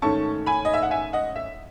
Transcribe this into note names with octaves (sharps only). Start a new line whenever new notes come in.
G#2 D#3 A3 C#4 A5 C#6
G#5 B5
D#5
E5
F#5
E5 G#5
D#5 F#5
E5